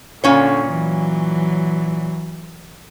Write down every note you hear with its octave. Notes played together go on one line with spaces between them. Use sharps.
A#2 D3 C#4 C#5
E3 F#3